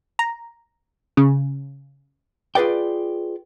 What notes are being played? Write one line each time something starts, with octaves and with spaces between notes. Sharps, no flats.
A#5
C#3
F4 G#4 B4 D5 G5